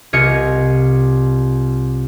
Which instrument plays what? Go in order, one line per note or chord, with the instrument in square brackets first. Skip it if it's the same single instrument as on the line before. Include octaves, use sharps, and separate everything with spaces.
[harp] C2 F4 D#5 G#6 C#7